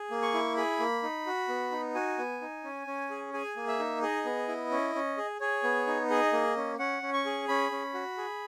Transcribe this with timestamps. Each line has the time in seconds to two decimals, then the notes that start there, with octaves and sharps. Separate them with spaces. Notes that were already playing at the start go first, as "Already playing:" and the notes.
Already playing: G#4
0.11 A#3
0.22 C#6
0.34 E4
0.57 G#4 B5
0.80 A#3
1.03 D#4
1.26 F#4
1.48 B3
1.71 D#4
1.95 F#4 G#5
2.18 B3
2.41 D#4
2.64 C#4
2.87 C#4
3.10 G#4
3.34 G#4 G#5
3.56 A#3
3.68 E5
3.79 D#4
4.02 G#4 D#5
4.25 B3
4.48 E4
4.71 C#4
4.95 C#4
5.17 G#4
5.40 G#4 C#5
5.64 B3
5.87 D#4
6.10 G#4 D#5
6.33 A#3
6.57 C#4
6.79 C#4 F#5
7.03 C#4
7.13 C#6
7.26 G#4
7.48 C#4 B5
7.72 C#4
7.94 F#4
8.18 G#4